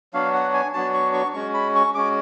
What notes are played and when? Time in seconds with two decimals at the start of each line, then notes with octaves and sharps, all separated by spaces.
0.13 F#3 B3 D4 F#4 F5
0.34 F#5
0.53 G#5
0.74 F#3 B3 D4 F#4 A5
0.94 C#6
1.13 C#6
1.34 G#3 C#4 F#4 C#6
1.54 B5
1.75 C#6
1.94 G#3 C#4 F#4 D6